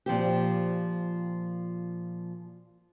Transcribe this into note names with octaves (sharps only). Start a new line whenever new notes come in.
A#2 F3 C4 G4